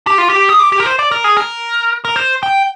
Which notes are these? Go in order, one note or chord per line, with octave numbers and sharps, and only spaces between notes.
G4
F4
G4
G#4
G4
G4
A#4
C5
D5
A#4
G#4
A#4
A#4
C5
G5